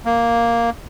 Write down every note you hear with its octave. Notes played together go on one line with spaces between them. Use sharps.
A#3